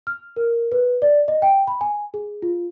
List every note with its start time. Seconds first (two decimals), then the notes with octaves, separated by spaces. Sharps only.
0.07 F6
0.36 A#4
0.72 B4
1.02 D5
1.28 D#5
1.42 G5
1.67 B5
1.81 G#5
2.14 G#4
2.42 F4